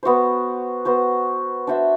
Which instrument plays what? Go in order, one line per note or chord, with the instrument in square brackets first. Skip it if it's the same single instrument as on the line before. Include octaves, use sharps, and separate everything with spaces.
[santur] B3 F#4 C5
B3 F#4 C5
D4 F#4 C5 E5